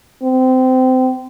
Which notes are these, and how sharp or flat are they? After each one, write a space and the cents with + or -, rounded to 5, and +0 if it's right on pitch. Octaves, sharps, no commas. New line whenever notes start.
C4 -25